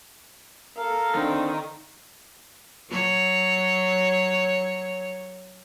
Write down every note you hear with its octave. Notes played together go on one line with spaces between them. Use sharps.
A4 A#4 F5
D3 D#3 C4
F#3 C#5